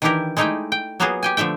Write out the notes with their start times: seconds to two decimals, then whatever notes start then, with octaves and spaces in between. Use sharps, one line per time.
0.02 D#3 E3 D4 E4 G4 A#4
0.37 G#3 A3 D#4 E4 D5 G5
0.72 G5
1.00 F#3 A#3 B3 F4 F#4 G#4
1.23 G4 G5 G#5
1.37 D3 F3 A3 E5 G5